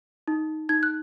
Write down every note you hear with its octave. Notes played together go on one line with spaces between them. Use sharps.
D#4
D#4 G#6
F#6